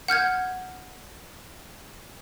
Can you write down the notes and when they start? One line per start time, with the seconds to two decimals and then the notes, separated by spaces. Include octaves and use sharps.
0.08 F#5 F6 G6 G#6